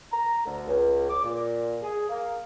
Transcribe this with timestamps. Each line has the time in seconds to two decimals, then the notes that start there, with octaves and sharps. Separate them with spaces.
0.12 A#5
0.45 D2
0.68 C#2
1.09 D6
1.23 A#2
1.82 G#4
2.09 A#3